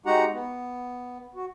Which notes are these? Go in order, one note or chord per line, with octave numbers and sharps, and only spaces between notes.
G#3 D#4 F#4 G4 F#5 A#5
B3
F#4